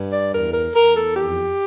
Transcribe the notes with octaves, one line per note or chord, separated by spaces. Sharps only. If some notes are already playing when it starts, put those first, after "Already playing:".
Already playing: G2
D5
E2 A#4
A#4
E2 A#4
A4
F2 G4